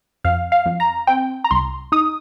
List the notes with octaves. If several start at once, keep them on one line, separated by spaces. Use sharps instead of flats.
F2 F5
F5
F2
A#5
C4 G5
A#5
C2 C6
D#4 D#6